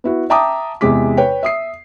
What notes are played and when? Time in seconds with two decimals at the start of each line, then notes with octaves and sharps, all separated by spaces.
0.04 B3 E4 F#4
0.30 E5 G5 A5 A#5 D6 D#6
0.81 E2 C3 G#3 D6 B6
1.17 B4 C#5 G5
1.43 E5 D#6 C7